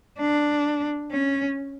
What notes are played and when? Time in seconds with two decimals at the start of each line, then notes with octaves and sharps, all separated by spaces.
0.19 D4
1.12 C#4